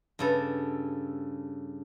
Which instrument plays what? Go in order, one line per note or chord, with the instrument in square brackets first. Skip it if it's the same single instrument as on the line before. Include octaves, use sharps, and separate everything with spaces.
[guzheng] G2 C#3 A4